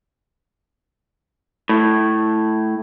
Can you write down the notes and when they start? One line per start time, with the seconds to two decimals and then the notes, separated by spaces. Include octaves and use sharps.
1.69 A2